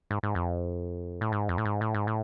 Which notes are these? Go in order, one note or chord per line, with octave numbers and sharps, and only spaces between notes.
G#2
G#2
F2
A2
G#2
F2
A2
G#2
A2
G#2
A2